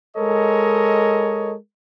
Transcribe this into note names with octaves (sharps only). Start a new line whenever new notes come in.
G#3 A4 A#4 C#5 D#5